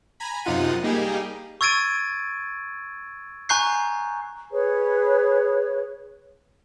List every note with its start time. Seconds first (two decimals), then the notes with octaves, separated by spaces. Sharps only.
0.20 G#5 A#5 B5
0.45 F#2 C3 D#4 F4 F#5 D#7
0.83 G3 A#3 D#4 G4 G#4
1.61 C#6 E6 G#6 A6 D7 D#7
3.49 G#5 A#5 C#6 F#6 G6 C7
4.52 G#4 B4 C#5